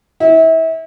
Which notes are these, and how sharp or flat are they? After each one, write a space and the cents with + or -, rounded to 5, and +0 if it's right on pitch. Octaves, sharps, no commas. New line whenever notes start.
E4 -30